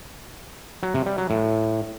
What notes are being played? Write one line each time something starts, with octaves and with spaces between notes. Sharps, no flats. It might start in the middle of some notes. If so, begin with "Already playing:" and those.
F#3
C3
G3
F#3
A2